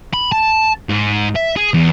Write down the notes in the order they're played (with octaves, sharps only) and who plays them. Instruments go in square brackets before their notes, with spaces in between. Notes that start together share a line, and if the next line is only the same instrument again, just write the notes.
[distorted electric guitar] B5
A5
G#2
E5
G#4
E2